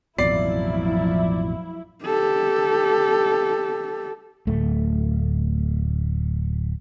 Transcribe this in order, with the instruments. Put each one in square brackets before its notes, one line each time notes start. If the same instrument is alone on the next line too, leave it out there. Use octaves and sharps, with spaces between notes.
[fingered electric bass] A1 F2 B2 [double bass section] F3 F#3 [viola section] E4 [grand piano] D5 C7
[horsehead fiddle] G4 A4
[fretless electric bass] D1 A3